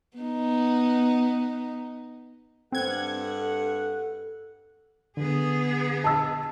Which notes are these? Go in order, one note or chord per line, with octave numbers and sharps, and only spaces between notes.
B3 D#4
G2 C4 A4 F#5 G#6
D3 B3 G#4
A5 E6